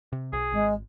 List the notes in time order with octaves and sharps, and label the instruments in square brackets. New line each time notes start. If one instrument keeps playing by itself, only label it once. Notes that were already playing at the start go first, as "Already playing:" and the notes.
[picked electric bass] C3
[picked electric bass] B1 [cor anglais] G#4
[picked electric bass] G#1 [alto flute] G#3